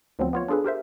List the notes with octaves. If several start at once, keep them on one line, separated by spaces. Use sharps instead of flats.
D2 F3 F#3 B3 C4
B3 F4 C#5
D4 F4 G#4 A4 B4
G4 A#4 C5 E5